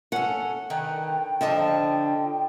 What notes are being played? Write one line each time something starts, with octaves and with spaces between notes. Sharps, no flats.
C#4 A4 F#5
D3 D#3 B4 G5
D3 F3 D#5 A5